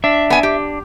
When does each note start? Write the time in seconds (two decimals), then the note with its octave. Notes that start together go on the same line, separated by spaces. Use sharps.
0.04 D4 E5
0.30 B3 G#5
0.43 G4